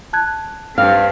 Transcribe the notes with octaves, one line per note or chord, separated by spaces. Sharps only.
A5 F#6 G#6
G2 C4 F5 F6